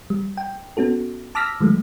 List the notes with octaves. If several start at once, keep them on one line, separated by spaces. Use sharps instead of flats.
G3
G5
B3 C#4 F#4 A4
A5 D6 E6 F6 A#6 B6
D#3 F#3 G#3 A3